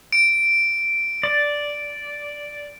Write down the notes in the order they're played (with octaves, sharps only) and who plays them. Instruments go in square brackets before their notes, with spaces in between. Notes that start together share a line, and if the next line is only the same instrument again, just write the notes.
[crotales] D7
[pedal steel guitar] D5